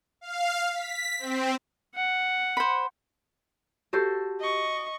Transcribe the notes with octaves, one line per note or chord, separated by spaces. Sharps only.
F5
B6
C4
F#5
C5 B5
F#4 G4 A4 C5
D#5 C#6